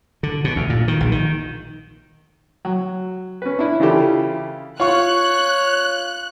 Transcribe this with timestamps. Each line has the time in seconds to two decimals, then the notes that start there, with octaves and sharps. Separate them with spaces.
0.23 D3
0.44 B2
0.56 D2
0.70 A#2
0.88 D#3
1.00 A#1
1.12 D#3
2.65 F#3
3.42 C#4 B4
3.59 D4 E4
3.80 C#3 E3 E4 F4 G4 A4
4.80 F4 C#5 C#6 F#6